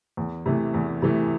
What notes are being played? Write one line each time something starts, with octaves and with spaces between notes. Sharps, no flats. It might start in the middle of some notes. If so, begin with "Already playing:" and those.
E2
C3 E3 A3
E2
C3 E3 A3